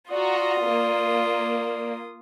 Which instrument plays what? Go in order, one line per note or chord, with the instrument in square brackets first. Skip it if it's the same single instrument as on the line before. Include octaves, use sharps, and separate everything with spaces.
[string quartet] F4 D#6 [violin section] F#4 A#5 [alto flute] D5
[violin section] A#3